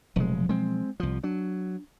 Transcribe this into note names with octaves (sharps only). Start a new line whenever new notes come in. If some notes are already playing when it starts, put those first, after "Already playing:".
F1 B2 F3 F#3 G#3
G#3 C4
C2 F3
F#3 D4